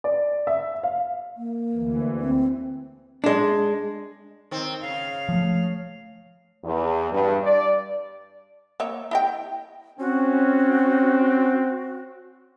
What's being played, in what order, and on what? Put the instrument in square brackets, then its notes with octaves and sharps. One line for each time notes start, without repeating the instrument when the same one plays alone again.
[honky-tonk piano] D5
E5
F5
[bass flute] A#3
[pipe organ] D2 E3
[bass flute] C4
[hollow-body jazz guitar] G#3 D4
[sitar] D#3 C4
[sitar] C#3 [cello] F5
[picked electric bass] F3 A3
[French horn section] E2
G2
D5
[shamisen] A#3 C#5 E5
E4 D#5 G5
[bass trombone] C4 [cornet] C#4 [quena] F#4